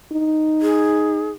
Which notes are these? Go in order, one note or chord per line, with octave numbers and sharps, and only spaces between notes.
D#4
G#4